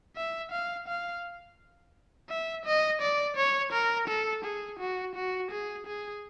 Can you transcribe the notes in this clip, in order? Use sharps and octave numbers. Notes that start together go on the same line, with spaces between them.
E5
F5
F5
E5
D#5
D5
C#5
A#4
A4
G#4
F#4
F#4
G#4
G#4